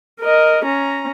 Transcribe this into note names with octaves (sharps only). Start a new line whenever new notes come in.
A#4 D#5
C#4 A#5